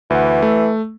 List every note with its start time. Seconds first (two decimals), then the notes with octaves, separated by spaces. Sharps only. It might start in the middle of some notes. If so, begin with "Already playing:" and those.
0.10 D2 E3 F#5
0.42 A3